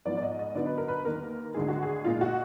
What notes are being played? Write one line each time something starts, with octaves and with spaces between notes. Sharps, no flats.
G#2 F3 B3 D5
D5
D#5
D#5
D3 F#3 B3 D#4 D5
B4
A#4
B4
D#2 D#3 A#3 A#4
D2 D3 G#3 G#4
F#4
G#4
A#2 G#3 D#4 F4
F#4